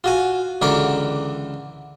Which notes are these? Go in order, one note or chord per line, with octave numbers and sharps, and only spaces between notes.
F4 F#4 G#5
C#2 D3 E3 A#4 C#5 D6